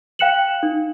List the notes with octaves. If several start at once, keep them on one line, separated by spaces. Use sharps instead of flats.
F5 G5 F#6 C#7 E7 F#7
D#4